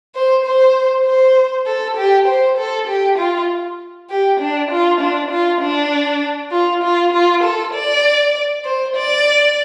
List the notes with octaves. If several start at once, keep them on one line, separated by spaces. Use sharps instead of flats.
C5
C5
C5
A4
G4
C5
A4
G4
F4
G4
D4
F4
D4
F4
D4
F4
F4
F4
A4
D5
C5
D5